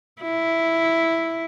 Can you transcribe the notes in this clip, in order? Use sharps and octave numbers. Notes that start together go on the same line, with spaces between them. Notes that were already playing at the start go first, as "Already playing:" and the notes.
E4